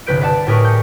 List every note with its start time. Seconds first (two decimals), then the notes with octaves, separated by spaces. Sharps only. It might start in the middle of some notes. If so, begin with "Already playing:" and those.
0.06 G1 C2 B4 G6 D7
0.21 B4 D5 F#5 A5
0.47 A2 G4 G#4 A#4 B4 C#6
0.65 G6 C#7